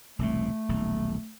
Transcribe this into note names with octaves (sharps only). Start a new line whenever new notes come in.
E1 C2 A2 A3
D#1 B1